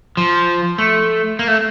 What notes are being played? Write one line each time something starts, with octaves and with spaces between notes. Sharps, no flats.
F3
A3
A#3
A3